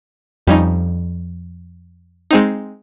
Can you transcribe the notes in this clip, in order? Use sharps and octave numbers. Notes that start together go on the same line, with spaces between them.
F2 G3 C#4 D#4
G#3 C4 D#4